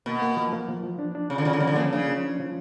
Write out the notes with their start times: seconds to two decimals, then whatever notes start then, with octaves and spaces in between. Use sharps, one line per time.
0.06 B2 A#3
0.22 A#3
0.37 F3
0.53 A#3
0.68 F3
0.83 F3
0.99 D4
1.15 D4
1.30 C#3 F3
1.38 D3
1.45 C#3 F3
1.53 D3
1.60 C#3 F3
1.67 D3
1.76 C#3 A#3
1.93 C#3 D4
2.08 F3
2.24 D4
2.40 F3